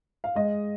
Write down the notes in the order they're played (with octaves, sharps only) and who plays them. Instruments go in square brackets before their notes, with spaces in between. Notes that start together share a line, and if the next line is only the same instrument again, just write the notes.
[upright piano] F5
G#3 D#5